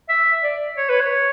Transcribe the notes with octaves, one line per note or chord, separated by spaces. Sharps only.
E5
D5
C#5
B4
C#5